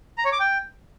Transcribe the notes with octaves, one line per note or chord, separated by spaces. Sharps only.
A#5
C#5
D6
G5